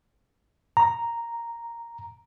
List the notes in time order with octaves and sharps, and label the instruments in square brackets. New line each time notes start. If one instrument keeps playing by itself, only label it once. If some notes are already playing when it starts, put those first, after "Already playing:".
[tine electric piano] A#5